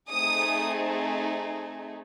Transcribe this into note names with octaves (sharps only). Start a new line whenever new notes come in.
A3 C4 D#4 G#4 D#6